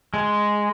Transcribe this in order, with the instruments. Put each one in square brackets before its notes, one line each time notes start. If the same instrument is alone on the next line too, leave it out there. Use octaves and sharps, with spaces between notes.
[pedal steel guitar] G#3